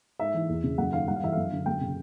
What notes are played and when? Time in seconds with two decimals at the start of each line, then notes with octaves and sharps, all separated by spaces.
0.19 G#2 E5
0.34 E3
0.49 E2
0.64 C#3
0.78 F#2 F#5
0.93 D#3 F5
1.08 G2 F#5
1.16 F5
1.23 E3 E5
1.32 F#2 F5
1.52 D3
1.66 F#2 G5
1.81 C#3